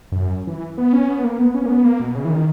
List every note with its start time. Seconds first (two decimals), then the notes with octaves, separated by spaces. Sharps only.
0.12 F#2
0.47 E3
0.78 B3
0.93 C#4
1.09 B3
1.24 A#3
1.39 B3
1.54 C#4
1.66 A#3
1.69 B3
1.84 A#3
2.00 B2
2.15 C#3
2.25 E3
2.30 D#3